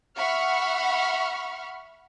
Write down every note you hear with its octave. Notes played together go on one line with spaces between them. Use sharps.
E5 F#5 B5 C#6 F6